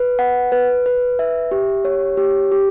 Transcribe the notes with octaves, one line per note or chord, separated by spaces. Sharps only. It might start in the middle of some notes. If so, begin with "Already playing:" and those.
Already playing: B4
F#5
B4
B4
E5
G4
C#5
G4
G4